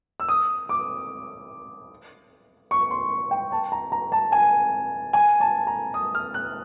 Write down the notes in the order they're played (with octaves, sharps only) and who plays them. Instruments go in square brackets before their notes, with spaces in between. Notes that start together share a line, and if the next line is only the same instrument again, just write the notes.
[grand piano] E6
D#6
D6
C#6
C6
G5
A5
A#5
A#5
A5
G#5
G#5
A5
A#5
D#6
F6
F#6